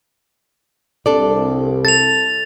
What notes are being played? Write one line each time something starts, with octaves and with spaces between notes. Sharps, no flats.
C2 D4 A4 D5
A4 A6 F7